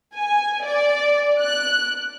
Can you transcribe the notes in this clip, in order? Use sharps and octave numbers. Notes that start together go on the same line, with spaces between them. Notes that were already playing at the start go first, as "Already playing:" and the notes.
G#5
D5
F#6